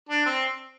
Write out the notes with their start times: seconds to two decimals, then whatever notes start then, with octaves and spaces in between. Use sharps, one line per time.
0.09 D4
0.26 C4